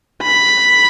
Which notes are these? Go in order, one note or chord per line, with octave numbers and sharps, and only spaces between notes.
B5